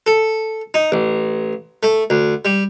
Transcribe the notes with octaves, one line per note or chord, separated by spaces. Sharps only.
A4
D#4
A1
A3
D2
G3